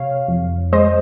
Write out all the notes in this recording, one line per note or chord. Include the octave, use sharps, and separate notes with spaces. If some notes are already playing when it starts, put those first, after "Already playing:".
Already playing: C3 C#5 F5
F2
G#3 C5 D#5